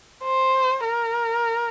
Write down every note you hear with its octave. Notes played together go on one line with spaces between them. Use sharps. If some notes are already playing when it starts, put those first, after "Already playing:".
C5
A#4